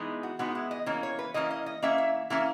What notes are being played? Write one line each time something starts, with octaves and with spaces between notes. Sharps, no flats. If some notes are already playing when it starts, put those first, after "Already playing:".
Already playing: E3 G#3 B3 D#4
F#4
E3 G#3 B3 D#4 F#4
E4
D#5
E3 A#3 C#4 C#5
C#5
B4
E3 A#3 C#4 D#5
D#5
D#5
E3 A#3 C#4 E5
E5
E3 A#3 C#4 E5